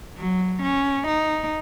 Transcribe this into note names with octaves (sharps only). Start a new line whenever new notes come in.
F#3
C#4
D#4